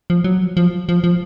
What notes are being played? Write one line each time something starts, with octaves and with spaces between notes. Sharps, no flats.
F3
F#3
F3
F3
F3